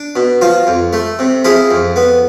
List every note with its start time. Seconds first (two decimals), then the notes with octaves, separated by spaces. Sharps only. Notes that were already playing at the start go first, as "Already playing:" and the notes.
Already playing: D4
0.16 B2
0.41 F3 F4
0.67 F2
0.93 A3
1.19 C3
1.45 F3 E4 G#4
1.71 F2
1.96 B3